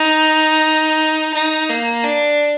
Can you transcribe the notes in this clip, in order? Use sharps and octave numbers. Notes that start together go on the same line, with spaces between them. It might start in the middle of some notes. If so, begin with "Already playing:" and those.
Already playing: D#4
D#4
A#3
D4